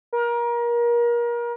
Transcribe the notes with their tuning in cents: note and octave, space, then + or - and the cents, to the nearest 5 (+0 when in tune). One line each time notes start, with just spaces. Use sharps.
A#4 +30